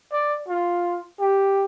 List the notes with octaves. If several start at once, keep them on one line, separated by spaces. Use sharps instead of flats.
D5
F4
G4